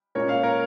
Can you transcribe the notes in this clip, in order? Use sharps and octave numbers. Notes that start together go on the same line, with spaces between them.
A#2 G#3 C#4 A#4 C#5
C#5 F5
A#4 C#5